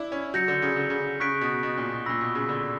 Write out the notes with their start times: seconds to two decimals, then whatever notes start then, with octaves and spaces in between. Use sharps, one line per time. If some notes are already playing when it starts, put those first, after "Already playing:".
Already playing: D4 E4
0.12 C#4
0.34 F#3 G6 A#6 C#7
0.48 D3
0.62 C#3
0.76 D3
0.90 C#3
1.20 C#3 C#6 F#6 B6 D7
1.41 B2
1.63 B2
1.77 A#2
1.92 B2
2.06 A#2 B5 E6 A#6
2.21 B2
2.35 C#3
2.49 D3